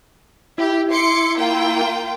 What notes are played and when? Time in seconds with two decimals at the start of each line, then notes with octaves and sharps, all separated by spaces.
0.58 E4 G4
0.92 C6 D6 C#7
1.37 A#3 F4 G5